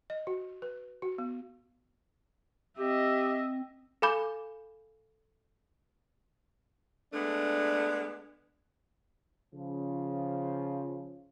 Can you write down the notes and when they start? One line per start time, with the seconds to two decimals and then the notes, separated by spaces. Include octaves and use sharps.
0.10 D#5
0.27 F#4
0.62 B4
1.02 F#4
1.18 B3
2.79 C4 G4 D#5 E5
4.02 A4 F5 G#5 B5 D6 G6
7.13 G#3 A3 B3 D4
9.54 C#3 F3